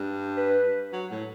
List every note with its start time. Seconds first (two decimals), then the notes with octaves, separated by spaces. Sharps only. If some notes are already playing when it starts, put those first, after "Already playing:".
Already playing: G2
0.37 B4
0.93 F#3
1.11 A2